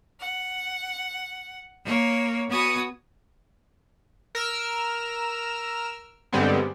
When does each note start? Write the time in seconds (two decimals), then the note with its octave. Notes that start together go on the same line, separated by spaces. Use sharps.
0.20 F#5
1.84 A#3 C#5
2.49 B3 F#4 B4 G#5 C#6 D#6
4.35 A#4 E6 F6
6.33 G2 D3 G3 G#3 B3 C4